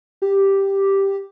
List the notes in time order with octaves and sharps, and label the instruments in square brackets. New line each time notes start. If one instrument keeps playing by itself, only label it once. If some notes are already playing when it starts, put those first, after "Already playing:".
[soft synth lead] G4